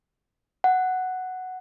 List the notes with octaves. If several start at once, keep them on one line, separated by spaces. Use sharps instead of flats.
F#5